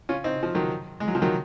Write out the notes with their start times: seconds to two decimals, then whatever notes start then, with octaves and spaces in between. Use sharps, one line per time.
0.09 C#4 F4
0.24 C4 D#4
0.43 F3
0.55 D#3 F#3
1.00 G#3
1.08 F#3
1.15 F3
1.22 D#3 F#3